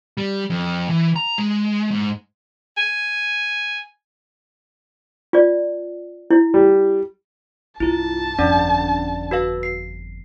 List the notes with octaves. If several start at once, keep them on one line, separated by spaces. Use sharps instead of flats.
G3
F2
E3
A#5
G#3
G#2
G#5
F4 D5
E4
G3
C2 G2 E4 F4 A5
G1 F2 C#4 D4 D5
F#4 B4 F5
C7